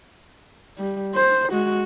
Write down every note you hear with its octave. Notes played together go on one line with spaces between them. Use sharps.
G3
C5
G#3 F#4